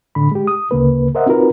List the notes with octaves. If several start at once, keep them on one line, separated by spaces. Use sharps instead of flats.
A2 D3 B5
G#3 G4
D#6
D2 C#3 A#3 B4
A#4 C5 D#5 E5 F#5
C4 D#4 F4 F#4 A#4 B4